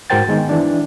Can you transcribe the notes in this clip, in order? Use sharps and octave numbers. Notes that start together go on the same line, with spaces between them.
G#2 F#4 A#4 C5 G5 A6
D#3 G#3 B3 D#4
E3 D4